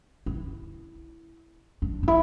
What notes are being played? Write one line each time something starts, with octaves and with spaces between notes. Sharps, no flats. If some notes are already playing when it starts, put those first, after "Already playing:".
E4
D4
D4
E4